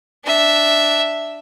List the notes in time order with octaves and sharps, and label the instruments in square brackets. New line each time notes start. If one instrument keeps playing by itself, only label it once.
[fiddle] D4 E5